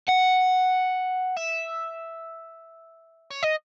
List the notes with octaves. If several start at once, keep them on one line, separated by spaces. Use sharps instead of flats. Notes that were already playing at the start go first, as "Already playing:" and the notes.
F#5
E5
C#5
D#5